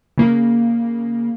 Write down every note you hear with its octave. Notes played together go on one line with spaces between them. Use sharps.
C#3 A#3